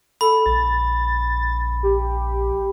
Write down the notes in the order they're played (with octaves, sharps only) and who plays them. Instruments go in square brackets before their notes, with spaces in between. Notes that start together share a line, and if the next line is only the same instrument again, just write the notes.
[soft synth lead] A4 [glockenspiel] B5
[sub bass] A#1 [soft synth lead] A6
[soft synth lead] G4